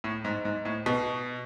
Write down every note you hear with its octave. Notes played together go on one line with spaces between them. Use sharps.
A2
G#2
G#2
A2
B2